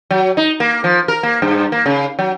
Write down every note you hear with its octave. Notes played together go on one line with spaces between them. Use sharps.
F#3
D#4
A#3
F3
A#4
A#3
G2
A#3
C#3
F#3